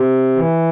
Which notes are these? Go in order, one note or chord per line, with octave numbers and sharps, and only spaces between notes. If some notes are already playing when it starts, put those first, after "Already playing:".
Already playing: C3
E3